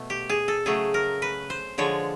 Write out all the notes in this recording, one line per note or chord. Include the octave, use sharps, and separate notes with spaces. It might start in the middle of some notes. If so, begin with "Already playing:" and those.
Already playing: B2 A3
G4
G#4
A4
C#3 F#3 A3 G#4
A#4
B4
C5
D3 F3 G#3 C#5